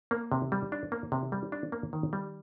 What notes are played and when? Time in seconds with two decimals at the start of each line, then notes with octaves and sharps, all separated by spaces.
0.11 A#3
0.32 C3
0.52 G3
0.72 D4
0.92 A#3
1.12 C3
1.32 G3
1.52 D4
1.72 A#3
1.93 D#3
2.13 G3